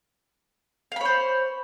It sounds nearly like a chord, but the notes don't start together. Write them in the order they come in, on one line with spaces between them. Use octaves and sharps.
F5 B5 C#5 C5